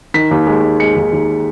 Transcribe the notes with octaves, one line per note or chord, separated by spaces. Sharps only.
D#3 B6
D#2
G#3
G#3
G#3 C#7
D#2
D#2